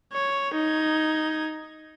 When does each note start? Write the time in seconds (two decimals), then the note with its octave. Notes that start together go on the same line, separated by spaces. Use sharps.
0.13 C#5
0.54 D#4 G#6